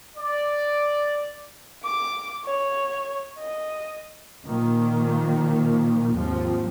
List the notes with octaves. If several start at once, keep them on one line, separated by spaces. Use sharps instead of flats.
D5
D6
C#5
D#5
A#2 D#3 F3 A#3
D#2 G#2 F3 C4